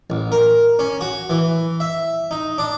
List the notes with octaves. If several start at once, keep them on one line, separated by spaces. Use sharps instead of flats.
A1
A#4
C#4
F#4
E3
E5
D#4
D4